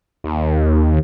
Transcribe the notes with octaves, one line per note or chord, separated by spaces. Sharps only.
D#2